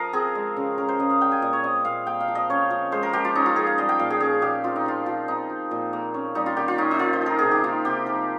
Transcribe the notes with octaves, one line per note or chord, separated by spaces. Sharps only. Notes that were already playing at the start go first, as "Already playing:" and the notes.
Already playing: F3 A#4 D#5 F5
C4 G#4
G#3
C#3
C#4 A#4
C5
C#3 D#5
F5
G3 G5
G#5
A#2 D#5
C#5
C4 D#5
A#2 F5
A#3 G5
F5
F3
D#5
C#4 C#5
F3
G#3 C5
A#4
F3 G4
F4
C#4 D#4
F4
F3 G#4
F5
G3 D#5
G5
A#2 F5
G#4
C#4 G#4
A#2 G4
C4 F4
D#4
F3 F4
F3 F4
C4 D#4
F3
A#2
A#3
C#4
G3 D#4
F4
D#3 G4
F4
C#4 D#4
D#4
D#3 F4
C5
F3 A#4
C3 G#4
G4
A#3 F4
C3 G4
F3 A#4